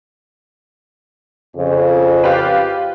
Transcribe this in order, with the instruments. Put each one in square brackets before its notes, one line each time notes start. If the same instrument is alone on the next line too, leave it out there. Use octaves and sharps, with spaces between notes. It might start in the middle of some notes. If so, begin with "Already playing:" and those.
[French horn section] F2 C#3
[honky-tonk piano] F4 G4 B4